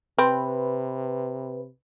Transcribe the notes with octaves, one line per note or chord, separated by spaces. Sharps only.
C3 C4 B4